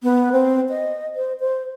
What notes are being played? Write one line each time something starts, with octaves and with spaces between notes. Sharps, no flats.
B3
C4
D#5
C5
C5